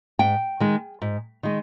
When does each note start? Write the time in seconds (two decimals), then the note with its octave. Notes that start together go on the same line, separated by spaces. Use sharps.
0.19 G#2 G5
0.60 D#3 G#3
1.02 G#2
1.43 D#3 G#3